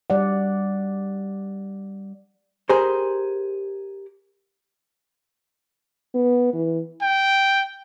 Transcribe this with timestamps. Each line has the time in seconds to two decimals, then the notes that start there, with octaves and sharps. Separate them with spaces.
0.10 G3 D5 F#5
2.70 G4 G#4 A#4 C5
6.15 B3
6.53 E3
7.02 G5